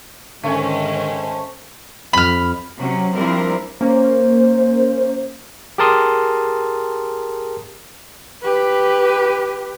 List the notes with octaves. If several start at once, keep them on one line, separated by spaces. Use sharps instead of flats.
G#2 D3 D#3 A3 C#4 C5 G#5
F2 B5 F6
C3 F#3 C#4
F3 G3 C4 D4 E4 A#4
A#3 C#4 C5
G4 G#4 A#4 A5 C6 D#6
G4 B4